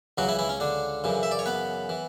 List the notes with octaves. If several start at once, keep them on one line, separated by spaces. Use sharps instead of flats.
C#2 C#3 E3 F#3 F#4
E3 E4
E3 E4
C#4
D3 D4
F#2 C#3 E3
E5
D5
C#5
B3 B4
E3